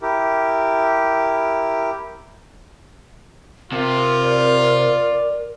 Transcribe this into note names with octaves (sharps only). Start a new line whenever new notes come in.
E4 G4 A#4
C3 F4 A#4
D5